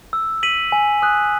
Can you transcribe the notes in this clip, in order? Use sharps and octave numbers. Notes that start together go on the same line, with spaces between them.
E6
B6 D#7 F#7
G#5
D#6 F#6